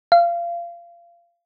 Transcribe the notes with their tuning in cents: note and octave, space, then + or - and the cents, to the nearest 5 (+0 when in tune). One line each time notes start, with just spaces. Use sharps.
F5 -25